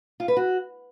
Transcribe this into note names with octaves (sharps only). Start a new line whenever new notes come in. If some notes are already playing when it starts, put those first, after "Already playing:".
F4
B4
F#4